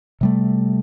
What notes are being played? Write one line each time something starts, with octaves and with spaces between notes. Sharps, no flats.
C3 G3 A3